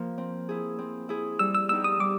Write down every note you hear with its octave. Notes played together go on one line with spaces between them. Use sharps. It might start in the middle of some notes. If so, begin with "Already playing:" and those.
Already playing: F3 A#3
C4
E4 G#4
C4
E4 G#4
G3 E6
E6
B3 D#4 G4 E6
D#6
G3 D6